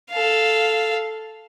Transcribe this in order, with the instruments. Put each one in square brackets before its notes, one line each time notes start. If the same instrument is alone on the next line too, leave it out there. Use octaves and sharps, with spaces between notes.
[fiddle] A4 F5